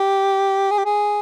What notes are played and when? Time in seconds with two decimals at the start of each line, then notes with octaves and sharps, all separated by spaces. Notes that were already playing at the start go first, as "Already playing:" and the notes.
Already playing: G4
0.71 G#4
0.78 G4
0.85 G#4